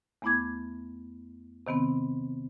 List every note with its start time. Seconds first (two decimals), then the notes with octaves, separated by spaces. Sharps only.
0.22 E2 A3 B3 E4 D6 G#6
1.67 C3 D#3 B3 C4